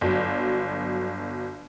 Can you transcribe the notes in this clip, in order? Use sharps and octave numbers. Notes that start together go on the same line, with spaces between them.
G1 F#3